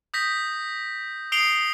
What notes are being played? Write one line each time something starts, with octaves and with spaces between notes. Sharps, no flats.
D#6 G6 A#6 B6
D#6 C7 D7 F7 G7